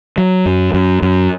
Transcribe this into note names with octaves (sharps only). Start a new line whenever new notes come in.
F#3
F#2
F#2
F#2